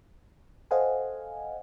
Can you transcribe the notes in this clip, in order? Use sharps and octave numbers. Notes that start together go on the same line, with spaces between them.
A4 C5 D#5 F5 F#5 G#5